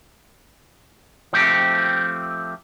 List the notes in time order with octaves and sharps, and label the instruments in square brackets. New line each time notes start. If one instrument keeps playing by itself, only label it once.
[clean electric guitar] F3 A3 C4 G4